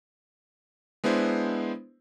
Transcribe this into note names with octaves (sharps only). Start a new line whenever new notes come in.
G#3 B3 D4 E4 C5